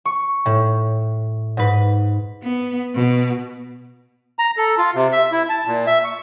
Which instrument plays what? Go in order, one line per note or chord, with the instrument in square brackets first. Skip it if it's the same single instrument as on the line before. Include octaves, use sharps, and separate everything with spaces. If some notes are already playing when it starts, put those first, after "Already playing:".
[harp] C#6
A2
G#2 B4
[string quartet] B3
B2
[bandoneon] A#5
A4
F4
C3
E5
E4
A5
A#2
E5
C#6